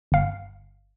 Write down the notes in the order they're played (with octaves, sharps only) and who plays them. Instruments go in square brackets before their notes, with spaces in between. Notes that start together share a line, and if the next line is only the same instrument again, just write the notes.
[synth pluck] G1 F5